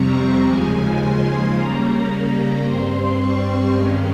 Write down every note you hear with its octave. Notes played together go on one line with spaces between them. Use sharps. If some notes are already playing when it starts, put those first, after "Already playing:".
Already playing: F2 C3 G3 C4 A#5 C#6
D#2 C#3 F3 G#3 G#5
C6
C#3 G3 A#3 C#4 A#5
A#5
G2 G3 C4 C6
C#6
G2 D#3 G#3 C#4